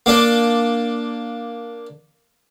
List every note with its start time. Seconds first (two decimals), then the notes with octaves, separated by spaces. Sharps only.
0.06 A#3 D4